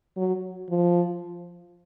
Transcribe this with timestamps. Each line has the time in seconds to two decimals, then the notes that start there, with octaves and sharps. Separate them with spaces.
0.17 F#3
0.70 F3